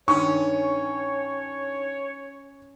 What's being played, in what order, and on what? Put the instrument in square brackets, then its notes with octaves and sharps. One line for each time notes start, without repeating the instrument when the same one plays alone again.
[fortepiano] G2 D#3 [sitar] C#4 [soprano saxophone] C#5 [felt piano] C#6